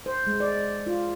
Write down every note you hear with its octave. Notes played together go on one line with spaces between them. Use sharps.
C5
G#3
D5
F4